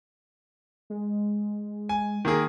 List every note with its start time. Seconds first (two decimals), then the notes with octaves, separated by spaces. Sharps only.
0.90 G#3
1.89 G#5
2.25 D#3 A#3 G#4 A#4